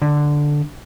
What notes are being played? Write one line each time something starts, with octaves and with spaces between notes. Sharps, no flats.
D3